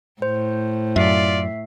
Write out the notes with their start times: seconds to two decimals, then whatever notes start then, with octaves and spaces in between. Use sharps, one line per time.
0.22 A2 C5
0.96 F#2 F4 D5 E5 C7